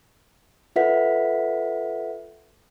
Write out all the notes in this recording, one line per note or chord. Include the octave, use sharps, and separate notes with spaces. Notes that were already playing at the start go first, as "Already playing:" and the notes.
F4 A4 B4 E5 F#5 B6